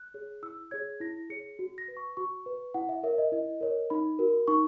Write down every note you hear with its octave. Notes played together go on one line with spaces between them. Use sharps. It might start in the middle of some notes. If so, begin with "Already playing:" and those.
Already playing: F#6
G#4 C#5
E4 E6
G#4 C#5 G#6
E4 A#6
G#4 C#5 C#7
F#4
A#6
B4
C#6
F#4 C#6
B4
E4 F#5
E5
A#4 C#5 E5
D#5
E4 D#5
A#4 C#5
D#4 B5
F#4 A#4
D#4 C#6